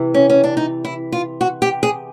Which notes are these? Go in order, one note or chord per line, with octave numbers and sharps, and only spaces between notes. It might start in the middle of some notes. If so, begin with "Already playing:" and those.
Already playing: C3 E3
C#4
C#4
D4
D#4
E4
F4
F#4
G4
G#4